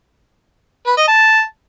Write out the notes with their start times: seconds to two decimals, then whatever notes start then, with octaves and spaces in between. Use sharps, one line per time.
0.87 B4
0.97 D#5
1.07 A5